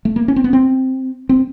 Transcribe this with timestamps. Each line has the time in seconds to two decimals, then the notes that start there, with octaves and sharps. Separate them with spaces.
0.05 A3
0.16 A#3
0.28 C#4
0.36 C4
0.44 B3
0.53 C4
1.29 C4